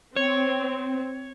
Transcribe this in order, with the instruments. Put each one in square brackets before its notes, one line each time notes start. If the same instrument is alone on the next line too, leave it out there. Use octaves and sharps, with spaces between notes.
[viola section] C4 [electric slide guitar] C#5